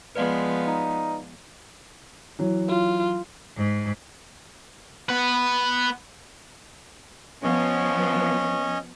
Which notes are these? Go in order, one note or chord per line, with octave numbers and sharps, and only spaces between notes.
F3 G#3 B3 B4 D5 F5
D#4
E3 F#3
F4
G#2
B3 B4
F3 B3 C#4 C#5 D#5